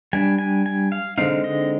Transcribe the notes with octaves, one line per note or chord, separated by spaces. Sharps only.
G3 D4 G#5
G#5
G#5
F5
D3 G#3 C4 D#4 F5
D#5